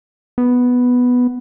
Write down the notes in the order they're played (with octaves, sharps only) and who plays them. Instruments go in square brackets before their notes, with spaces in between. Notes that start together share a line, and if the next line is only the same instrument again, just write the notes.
[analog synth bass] B3